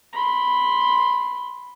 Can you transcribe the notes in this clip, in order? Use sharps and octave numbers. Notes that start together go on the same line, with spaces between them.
B5 C6